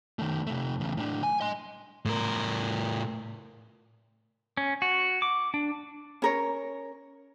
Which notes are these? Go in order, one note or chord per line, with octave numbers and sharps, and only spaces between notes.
D#3 A3
C3 A3
E2 C#3
A2 D4
G#5
D#5 C6
A2 A#4
C#4
F#4
D6
D4
C#4 A#4 C#5